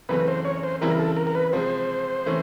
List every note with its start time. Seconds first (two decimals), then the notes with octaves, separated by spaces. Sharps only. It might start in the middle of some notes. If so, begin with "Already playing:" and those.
0.09 F#2 C#3 E3 A3 C4 B4
0.28 C5
0.45 C#5
0.63 C5
0.81 C#3 E3 G3 C4 E4 A#4
0.99 A4
1.17 A#4
1.27 A#4
1.35 B4
1.53 C3 F3 G#3 C5
2.26 C3 E3 A3 C#4